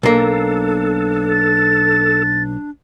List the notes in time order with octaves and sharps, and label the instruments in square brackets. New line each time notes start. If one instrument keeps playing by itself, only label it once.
[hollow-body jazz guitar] B1 A#3 [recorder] D4 [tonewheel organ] A4
[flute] A6